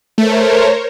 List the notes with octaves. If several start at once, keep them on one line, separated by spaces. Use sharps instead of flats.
A3 A#4 C5 C#5